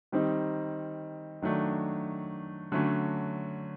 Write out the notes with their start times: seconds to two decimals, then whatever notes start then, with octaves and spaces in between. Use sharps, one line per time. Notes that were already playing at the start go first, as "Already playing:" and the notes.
0.12 D#3 G3 C4 D#4
1.42 D#3 F#3 A3 D4
2.72 D3 F#3 A3 C#4